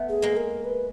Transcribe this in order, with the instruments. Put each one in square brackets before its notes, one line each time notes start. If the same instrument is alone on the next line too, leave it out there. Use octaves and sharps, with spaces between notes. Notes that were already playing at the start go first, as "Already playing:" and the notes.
Already playing: [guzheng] A3 B3
[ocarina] G#4
[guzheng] G#3 A#3
[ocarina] A#4
B4